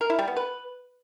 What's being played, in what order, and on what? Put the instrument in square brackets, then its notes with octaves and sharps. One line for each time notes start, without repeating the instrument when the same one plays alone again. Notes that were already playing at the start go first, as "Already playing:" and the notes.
[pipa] A#4
E4
G3
B3
B4